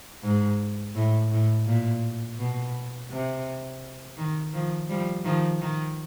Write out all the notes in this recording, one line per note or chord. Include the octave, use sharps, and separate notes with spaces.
G#2
A2
A2
A#2
B2
C3
D#3
D#3 F3
F3 G3
D#3 F3
D#3